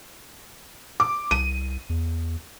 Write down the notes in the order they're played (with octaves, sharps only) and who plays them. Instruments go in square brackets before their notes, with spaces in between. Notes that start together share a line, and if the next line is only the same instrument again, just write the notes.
[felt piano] D6
[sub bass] C2 [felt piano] D#7
[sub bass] E2